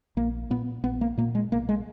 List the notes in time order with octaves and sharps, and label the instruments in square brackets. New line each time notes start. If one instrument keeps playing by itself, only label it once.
[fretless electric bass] A#1 A#3
A#2 B3
A#1 B3
A#3
A#2 A#3
G#3
B1 A#3
G#3